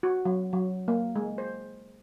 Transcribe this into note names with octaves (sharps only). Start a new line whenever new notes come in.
F#4
F#3
F#3
A#3
G#3
C5